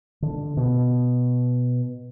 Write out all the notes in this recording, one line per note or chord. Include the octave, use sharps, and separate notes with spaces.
D3
B2